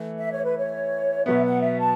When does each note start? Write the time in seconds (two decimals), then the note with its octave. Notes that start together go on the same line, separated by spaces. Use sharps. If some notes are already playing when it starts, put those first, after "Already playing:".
Already playing: E3 A3
0.18 E5
0.31 C#5
0.45 B4
0.57 C#5
1.26 B2 F#3 B3 E5
1.44 F#5
1.61 E5
1.79 A5